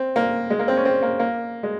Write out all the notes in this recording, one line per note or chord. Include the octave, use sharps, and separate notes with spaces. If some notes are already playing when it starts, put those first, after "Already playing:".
Already playing: C4
A#3
G#3
A#3
C4
C#4
C4
A#3
A#3
G#3